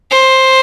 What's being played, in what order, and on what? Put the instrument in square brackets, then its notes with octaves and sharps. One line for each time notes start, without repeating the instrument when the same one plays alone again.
[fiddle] C5